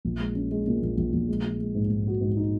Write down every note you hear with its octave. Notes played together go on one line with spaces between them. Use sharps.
A#1
G#3
C#4
G#3
A#2
A#1
A#1
A#1
G#3
G#3
G#3
G#2
G#2
F#4
G#2
D#4